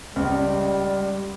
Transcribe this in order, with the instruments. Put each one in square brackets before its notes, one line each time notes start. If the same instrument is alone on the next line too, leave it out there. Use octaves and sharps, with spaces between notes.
[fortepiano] C#2 [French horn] G3